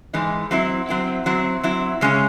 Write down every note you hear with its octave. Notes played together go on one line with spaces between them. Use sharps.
G#2 E3 G#3 D#4
F#3 C4 E4
F#3 C4 E4
F#3 C4 E4
F#3 C4 E4
C#3 G#3 C#4